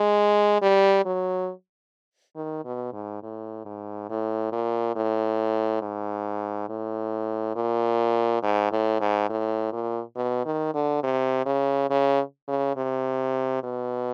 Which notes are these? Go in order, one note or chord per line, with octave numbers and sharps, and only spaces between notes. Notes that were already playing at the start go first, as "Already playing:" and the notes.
Already playing: G#3
G3
F#3
D#3
B2
G#2
A2
G#2
A2
A#2
A2
G#2
A2
A#2
G#2
A2
G#2
A2
A#2
B2
D#3
D3
C3
C#3
C#3
C#3
C3
B2